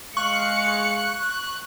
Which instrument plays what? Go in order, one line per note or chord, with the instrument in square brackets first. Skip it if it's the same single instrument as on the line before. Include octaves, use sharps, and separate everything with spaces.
[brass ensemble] G#3 F5 [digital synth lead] C#6 [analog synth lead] F#6 [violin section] C#7